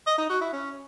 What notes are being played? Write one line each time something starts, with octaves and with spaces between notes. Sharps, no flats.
D#5
D#4
F#4
E4
C#4